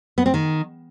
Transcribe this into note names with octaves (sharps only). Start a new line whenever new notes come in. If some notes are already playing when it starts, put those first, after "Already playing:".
B3
C4
D#3